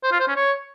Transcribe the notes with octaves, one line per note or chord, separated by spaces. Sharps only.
C5
F4
C5
C#4
C#5